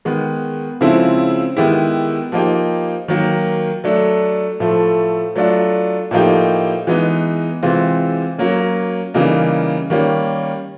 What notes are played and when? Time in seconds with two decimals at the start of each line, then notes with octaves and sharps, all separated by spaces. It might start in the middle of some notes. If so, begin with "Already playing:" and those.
0.05 D#3 G#3 B3
0.81 C#3 F3 G#3 C4 E4
1.57 D#3 G#3 B3 E4 G4
2.32 F3 A#3 D#4 G4
3.08 D#3 F#3 A#3
3.84 F#3 A3 D4
4.60 A2 F3 A3
5.36 F#3 A3 D4 F4
6.11 A2 F3 A#3 D#4 G4
6.87 E3 G#3 B3 D#4
7.63 C3 E3 G#3 C4 F4
8.38 F#3 A#3 C#4
9.14 C#3 E3 G3 A#3 D#4
9.90 D#3 G3 A#3 C#4